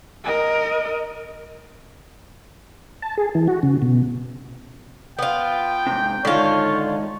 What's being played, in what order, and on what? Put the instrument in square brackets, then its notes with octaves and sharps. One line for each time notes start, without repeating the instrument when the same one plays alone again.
[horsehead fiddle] A#4 D#5
[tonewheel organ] A5
G#4
E3
F#4
C#3
B2
[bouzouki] B3 F4 [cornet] G5
[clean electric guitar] G#2 C3
[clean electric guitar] G#2 D#3 D#4 [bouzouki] D3 F4 [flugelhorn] C#5